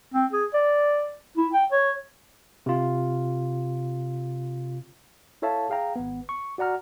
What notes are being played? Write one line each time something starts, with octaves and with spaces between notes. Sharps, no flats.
C4
G#4
D5
E4
G5
C#5
C3 F4
E4 A4 C#5 E5 F5 A5
G#4 F5 G5 A#5
G#1 B3
C#6
F#4 D5 F#5 A#5 F6